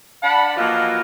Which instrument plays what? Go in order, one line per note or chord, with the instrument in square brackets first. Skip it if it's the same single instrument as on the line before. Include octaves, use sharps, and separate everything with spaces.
[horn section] D4 F#5 A5 B5
E3 F3 A#3 F4 F#4 D#5